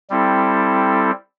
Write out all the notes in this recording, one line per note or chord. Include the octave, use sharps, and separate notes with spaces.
G3 C4 E4 A4